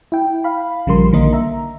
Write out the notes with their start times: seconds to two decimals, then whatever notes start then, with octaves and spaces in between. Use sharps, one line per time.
0.12 E4 G5
0.44 F5 B5
0.87 A#1 C#3 F3 G3 A#4 C6
1.12 B1 D3 D#3 A#3 A#4 D#5
1.33 E5 A#5